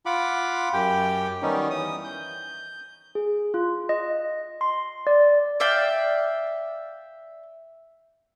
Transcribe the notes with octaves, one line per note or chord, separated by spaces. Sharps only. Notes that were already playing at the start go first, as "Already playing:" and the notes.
F4 F#5 B5 D6
F#2 G4 G5
D#3 G3 B3 C#4 D#4
E3 D#6
G6
G#4
F4
D#5
C6
D5
D5 E5 F5 G5